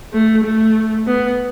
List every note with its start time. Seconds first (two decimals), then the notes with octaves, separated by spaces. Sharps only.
0.13 A3
0.44 A3
1.07 B3